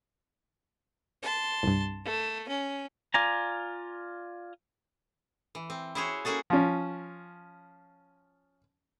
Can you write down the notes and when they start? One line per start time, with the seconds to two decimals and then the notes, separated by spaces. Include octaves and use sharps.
1.23 A5 C6
1.63 C2 G2
2.05 A3
2.48 C#4
3.14 F4 D5 G#5 A#5
5.55 E3
5.70 C4
5.95 E4 F#4 G#4 C5 C#5
6.25 A#3 C#4 F#4 G#4 A4
6.50 F3 C#4